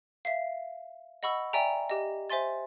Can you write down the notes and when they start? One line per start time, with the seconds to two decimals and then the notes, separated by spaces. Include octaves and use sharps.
0.25 E5 F5
1.23 D#5 F#5 B5 C#6 E6
1.53 D5 E5 G5 G#5 A#5
1.90 G4 D#5
2.30 C5 E5 G#5 C6 A6